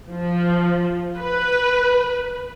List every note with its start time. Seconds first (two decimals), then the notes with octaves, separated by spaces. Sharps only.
0.10 F3
1.17 B4